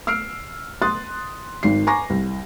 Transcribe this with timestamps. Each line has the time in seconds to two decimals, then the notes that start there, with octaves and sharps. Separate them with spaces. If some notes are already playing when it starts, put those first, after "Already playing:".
0.07 E6 F6 C7 D7
0.82 C6 D#6 F#6 A6
1.63 G#1 D#3 C7
1.87 G#5 A#5 C#6 D6 A#6
2.10 C2